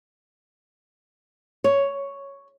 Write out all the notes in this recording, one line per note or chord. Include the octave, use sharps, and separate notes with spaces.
C#5